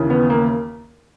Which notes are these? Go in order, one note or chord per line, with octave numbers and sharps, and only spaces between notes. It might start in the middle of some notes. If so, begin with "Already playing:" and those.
Already playing: D#2 C#3 E3
B3
A#3